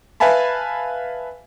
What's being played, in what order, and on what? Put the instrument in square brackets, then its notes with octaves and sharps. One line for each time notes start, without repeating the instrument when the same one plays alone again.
[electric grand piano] B4 E5 F5 G#5 A5 B5